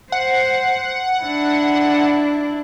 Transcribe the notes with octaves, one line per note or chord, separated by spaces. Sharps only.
C5 F#5
D4 E4